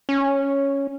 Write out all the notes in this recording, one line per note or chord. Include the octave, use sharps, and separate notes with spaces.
C#4